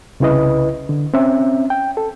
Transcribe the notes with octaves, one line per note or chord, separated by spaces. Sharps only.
C2 C#3 E4 B4 D#5
D3
C4 C#4 E5
G5
A4